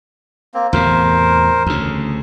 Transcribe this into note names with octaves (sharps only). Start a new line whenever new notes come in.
A#3 C4
E2 A2 C3 A#4 C5
D2 C#3